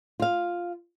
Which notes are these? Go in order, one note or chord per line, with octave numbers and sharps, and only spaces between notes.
F4 F5